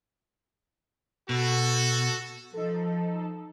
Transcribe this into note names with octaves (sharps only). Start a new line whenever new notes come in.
B2 F#4 A4
F3 D#4 A4